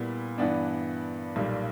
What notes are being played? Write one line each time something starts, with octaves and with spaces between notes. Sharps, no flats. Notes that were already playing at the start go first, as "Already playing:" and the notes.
Already playing: A#2 G3 B3 E4
G2 E3 B3 D4
B1 A#2 G3